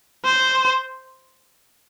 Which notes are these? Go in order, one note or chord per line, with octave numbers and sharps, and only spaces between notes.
C5